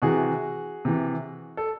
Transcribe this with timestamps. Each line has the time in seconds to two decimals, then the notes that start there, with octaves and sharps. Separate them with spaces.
0.02 C3 E3 F#4 G#4
0.85 C3 E3
1.57 A4